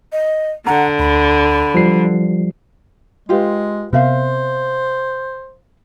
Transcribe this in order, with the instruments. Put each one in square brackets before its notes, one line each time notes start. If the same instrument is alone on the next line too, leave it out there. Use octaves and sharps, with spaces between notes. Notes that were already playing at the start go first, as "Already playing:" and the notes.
[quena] D#5
[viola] D3 [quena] F#5 [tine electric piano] A#5
[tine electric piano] D2 [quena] B5
[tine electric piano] F3 G3 C7
[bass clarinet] G#3 [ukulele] F4 G4 B4
[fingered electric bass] C3 B3 C4 [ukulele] A#4 E5 F5 [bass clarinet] C5